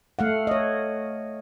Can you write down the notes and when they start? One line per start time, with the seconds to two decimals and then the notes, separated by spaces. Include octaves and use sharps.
0.19 A3 F5 F#5
0.47 C#5 D#5